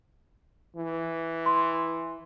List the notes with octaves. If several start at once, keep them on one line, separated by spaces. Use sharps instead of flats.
E3
C6